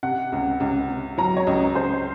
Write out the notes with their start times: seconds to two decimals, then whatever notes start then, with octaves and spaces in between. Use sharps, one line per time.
0.03 C3 F#5
0.32 C#2
0.60 C#2
0.90 C3
1.18 F#3 A#5
1.37 C#5
1.47 C#2 D#5
1.75 C#2 C5